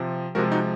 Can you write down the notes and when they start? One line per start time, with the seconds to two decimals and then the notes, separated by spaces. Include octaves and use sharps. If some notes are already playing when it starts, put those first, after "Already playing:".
Already playing: C3 F3
0.35 C3 F3 G#3 F#4 A#4
0.52 D#4 F#4